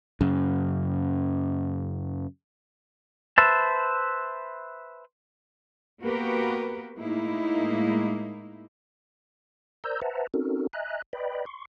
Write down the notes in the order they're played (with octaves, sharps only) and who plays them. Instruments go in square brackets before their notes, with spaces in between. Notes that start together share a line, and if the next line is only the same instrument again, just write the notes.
[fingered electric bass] F#2 C#3
[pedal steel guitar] B4 C5 E5 A5
[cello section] A#3 B3 F#4 G4 A#4 B4
A2 G#3 A#3 D#4 E4
[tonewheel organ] A#4 C5 D5 A#5 E6 G6
B4 C5 E5 F#5 A5 A#5
C4 C#4 D#4 F#4 A4 A#4
D#5 E5 G#5 A#5 F#6
B4 D5 D#5 G5 B5
C6 C#6